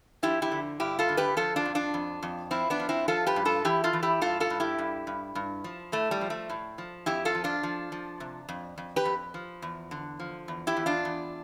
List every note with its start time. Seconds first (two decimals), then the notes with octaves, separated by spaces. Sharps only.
0.23 F3 E4 G4
0.42 E4 G4
0.51 D3
0.80 G2 E4 G4
0.99 F4 A4
1.09 D3
1.17 G4 B4
1.37 F3 F4 A4
1.56 D4 F4
1.65 F2
1.75 D4 F4
1.94 F2
2.23 F2
2.51 F3 C4 E4
2.70 B3 D4
2.80 F3
2.89 C4 E4
3.08 F3 F4 A4
3.27 G4 B4
3.36 G2
3.45 F4 A4
3.65 E3 E4 G4
3.84 F4 A4
3.93 E3
4.03 E4 G4
4.21 G2 F4 A4
4.40 F4 A4
4.50 G2
4.60 E4 G4
4.79 G2
5.07 G2
5.35 G2
5.64 F3
5.92 A2 A3
6.11 G3
6.21 F3
6.30 A3
6.49 A2
6.78 F3
7.06 F2 E4 G4
7.25 F4 A4
7.35 F3
7.44 D4 F4
7.63 F3
7.92 F3
8.20 C3
8.49 F2
8.78 F2
8.96 G4 B4
9.05 F2
9.34 F3
9.62 E2
9.91 D3
10.20 F3
10.48 E2
10.67 E4 G4
10.77 E2
10.86 D4 F4
11.05 E2